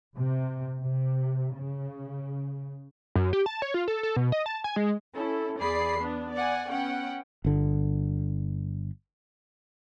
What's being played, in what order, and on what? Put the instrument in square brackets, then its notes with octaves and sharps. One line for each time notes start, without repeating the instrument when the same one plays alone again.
[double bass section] C3
C3
C#3
[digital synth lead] F#2
G4
A5
C#5
F4
A4
A4
B2
D#5
A5
G#5
G#3
[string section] C#4 E4 A4
E2 G#4 D5 B5 C7
B3 D4
D5 F#5 G#5
B3 C#4 F#5 G5
[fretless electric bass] G1 D3